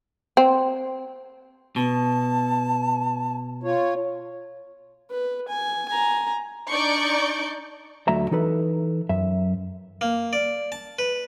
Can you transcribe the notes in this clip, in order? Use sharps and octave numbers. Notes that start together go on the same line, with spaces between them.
C4
B2 A5
F4 C#5
B4
G#5
G#5 A#5
D4 D#4 D5 C#6 G6 D7
D2 D3 F#3 A3 E5 A#5
E3 D#4 A4 B4
F#2 E5
A#3
D5
A5
B4